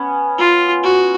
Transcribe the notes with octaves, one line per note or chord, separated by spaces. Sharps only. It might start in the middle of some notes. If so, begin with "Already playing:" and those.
Already playing: B3 C#4
F4
F#4